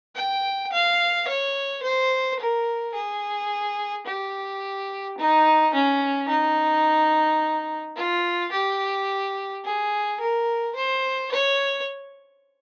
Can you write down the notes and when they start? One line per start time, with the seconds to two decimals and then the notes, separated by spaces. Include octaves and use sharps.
0.15 G5
0.72 F5
1.28 C#5
1.83 C5
2.39 A#4
2.94 G#4
4.07 G4
5.18 D#4
5.74 C#4
6.29 D#4
7.96 F4
8.52 G4
9.65 G#4
10.20 A#4
10.76 C5
11.32 C#5